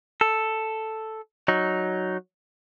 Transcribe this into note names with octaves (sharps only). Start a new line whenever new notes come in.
A4
F#3 D#4